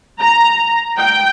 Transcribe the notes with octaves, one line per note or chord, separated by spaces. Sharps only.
A#5
G5